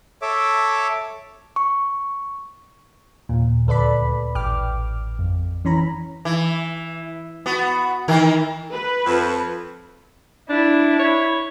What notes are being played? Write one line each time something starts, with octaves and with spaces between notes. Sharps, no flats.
A4 C#5 E5 D6
C#6
D#2 A#2
D2 A4 B4 D5 B5
A1 G5 D6 F6
F2
E3 C#4 A#5 B5
E3
B3 F#4
D#3 E3 A#4
B4
F2
D4 E4
C#5